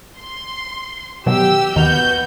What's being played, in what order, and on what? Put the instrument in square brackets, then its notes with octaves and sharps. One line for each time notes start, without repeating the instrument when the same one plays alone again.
[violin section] C6
[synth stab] B2 D#3 F#3 [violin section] G4 E6
[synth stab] D#2 D#3 F6 [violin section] B3 F#4 G6